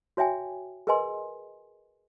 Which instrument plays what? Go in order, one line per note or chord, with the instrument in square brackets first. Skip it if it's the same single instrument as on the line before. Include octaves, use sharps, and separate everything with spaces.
[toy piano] F#4 C#5 E5 G5 G#5
G#4 A#4 B4 D#5 G#5 C6